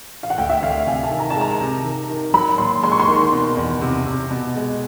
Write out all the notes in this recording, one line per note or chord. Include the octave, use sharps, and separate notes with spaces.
F5
F#5
D2 G5
E5
D2 F5
C3 G#5
A5
D#3
A#5
A5
G#3
A#5
C3
D#3
D#3
F#3 B5
A#2 C6
G#3 C6
C#6
C6
D#3
B2
E2
C3
C3
B2
G#3